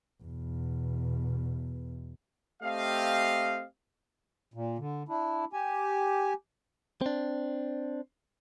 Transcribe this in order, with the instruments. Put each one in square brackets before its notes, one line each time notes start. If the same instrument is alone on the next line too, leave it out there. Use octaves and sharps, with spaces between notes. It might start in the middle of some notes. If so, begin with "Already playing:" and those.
[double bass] E2 B2
[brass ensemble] A3 C4 G4 D#5 F5
[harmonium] A#2
D3
D4 E4
G4 G#5
[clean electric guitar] C4 D4